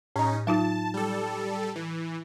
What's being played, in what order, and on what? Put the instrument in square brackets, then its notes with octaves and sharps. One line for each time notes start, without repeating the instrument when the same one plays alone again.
[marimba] A2 A#5 [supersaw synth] C#4 D#4
[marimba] F#3 D#4 F4 [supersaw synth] A5
[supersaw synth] G3 A4
E3